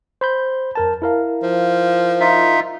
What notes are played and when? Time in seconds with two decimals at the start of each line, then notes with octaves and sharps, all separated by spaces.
0.21 C5 B5 G6
0.75 F2 A#4 A5
1.02 E4 A#4 F5
1.43 F3
2.20 D#4 F4 E5